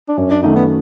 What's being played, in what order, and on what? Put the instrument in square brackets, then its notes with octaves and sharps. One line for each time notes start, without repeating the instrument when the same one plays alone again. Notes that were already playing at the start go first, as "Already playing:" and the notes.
[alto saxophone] D4
[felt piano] F#2 [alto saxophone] C#4
[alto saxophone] D4
[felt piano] D#3 F#3 A3 C#4 [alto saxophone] D#4
[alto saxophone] B3